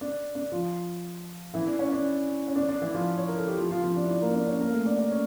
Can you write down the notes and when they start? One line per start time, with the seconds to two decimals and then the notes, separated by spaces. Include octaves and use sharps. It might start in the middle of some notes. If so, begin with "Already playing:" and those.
0.01 D4
0.35 D4
0.52 F3 F4
1.54 E3 E4
1.67 D4
1.79 C#4
1.92 D4
2.48 C#4
2.56 D4
2.69 D4
2.81 E3 E4
2.94 F3 F4
3.17 C#5
3.28 A#4
3.38 A4
3.48 G4
3.58 F3 F4
3.71 F3 F4
3.83 F3 F4
3.96 D4
4.03 E4
4.09 D4
4.22 A#3 A#4
4.34 D4 D5
4.47 C#4 C#5
4.60 A#3 A#4
4.73 A3 A4
4.86 D4 D5
4.99 D4 D5
5.11 C#4 C#5